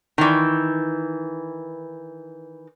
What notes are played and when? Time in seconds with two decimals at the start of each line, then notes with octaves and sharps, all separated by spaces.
0.18 D#3 E3